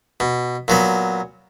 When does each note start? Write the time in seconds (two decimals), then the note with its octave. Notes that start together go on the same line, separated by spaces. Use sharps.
0.20 B2
0.68 A#2 F#3 B3